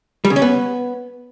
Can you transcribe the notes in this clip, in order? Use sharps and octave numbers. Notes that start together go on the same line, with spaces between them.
G3
C#3
C#4
B3